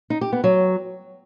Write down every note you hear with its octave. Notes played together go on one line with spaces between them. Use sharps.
D#4
G4
B3
F#3